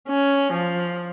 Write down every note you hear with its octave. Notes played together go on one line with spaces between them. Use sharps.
C#4
F3